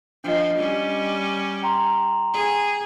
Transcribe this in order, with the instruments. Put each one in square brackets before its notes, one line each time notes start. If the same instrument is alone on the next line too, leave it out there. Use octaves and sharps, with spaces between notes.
[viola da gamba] F3 [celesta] D4 D#5
[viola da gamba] G3 C#4
[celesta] G5 A#5 C6
[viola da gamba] G#4